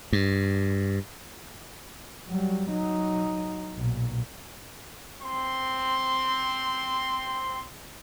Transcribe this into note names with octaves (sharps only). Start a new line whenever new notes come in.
G2
F#3 G3
F#3 D#4
B1 A#2
C4 C6